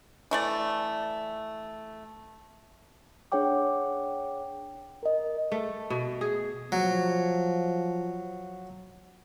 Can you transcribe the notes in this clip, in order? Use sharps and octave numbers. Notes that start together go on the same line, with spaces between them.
E3 A3 D5
D4 G#4 C#5 F#5 G5 D6
A#4 D#5
A3
B2
G#4
F3 F#3